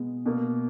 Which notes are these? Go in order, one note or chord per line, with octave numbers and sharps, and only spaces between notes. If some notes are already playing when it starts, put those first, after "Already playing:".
Already playing: B2 G#3 B3
B2 A#3